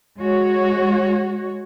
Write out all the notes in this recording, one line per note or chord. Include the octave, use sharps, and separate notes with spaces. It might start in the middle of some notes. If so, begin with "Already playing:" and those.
G#3 F#4 C#5